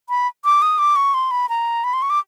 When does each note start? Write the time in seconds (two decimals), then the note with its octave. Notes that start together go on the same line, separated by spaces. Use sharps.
0.09 B5
0.45 D6
0.62 D#6
0.78 D6
0.96 C#6
1.14 C6
1.31 B5
1.49 A#5
1.84 B5
1.93 C6
2.02 C#6
2.10 D6